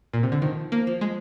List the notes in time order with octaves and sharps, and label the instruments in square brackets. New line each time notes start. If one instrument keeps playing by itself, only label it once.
[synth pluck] A#2
C3
D3
[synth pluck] D#3 [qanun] F3
[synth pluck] A#3
[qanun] F3
[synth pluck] G#3